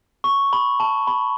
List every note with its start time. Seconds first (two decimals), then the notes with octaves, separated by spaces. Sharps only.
0.24 C#6
0.53 B5
0.80 A5
1.07 B5